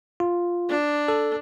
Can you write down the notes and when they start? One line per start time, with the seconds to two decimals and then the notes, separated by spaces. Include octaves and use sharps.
0.20 F4
0.69 D4
1.08 A4